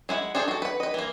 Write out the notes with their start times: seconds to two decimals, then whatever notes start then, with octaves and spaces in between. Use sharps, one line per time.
0.09 G#3 E4 F#5
0.35 D4 G#4 A4 C5
0.48 F#4 A4
0.62 B4 F#5
0.80 B4 D#5
0.94 E3 A#3